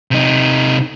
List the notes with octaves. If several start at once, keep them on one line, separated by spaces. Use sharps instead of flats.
C3 D#4